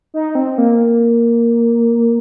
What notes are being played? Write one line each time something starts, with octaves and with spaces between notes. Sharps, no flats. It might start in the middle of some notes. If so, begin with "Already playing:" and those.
D#4
C4
A#3